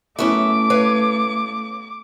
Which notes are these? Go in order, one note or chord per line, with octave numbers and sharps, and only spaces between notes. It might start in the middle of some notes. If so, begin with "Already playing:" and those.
F#2 A3 B3 C#4 E4 E5 D6
B4 C#5 F5